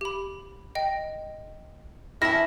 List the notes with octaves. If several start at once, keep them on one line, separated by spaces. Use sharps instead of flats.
G4 B5
D#5 G5
E3 E4 A5 C6 F6 A#6